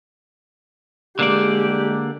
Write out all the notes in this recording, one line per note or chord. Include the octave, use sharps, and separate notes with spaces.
D3 G#3 A#3 G4 D5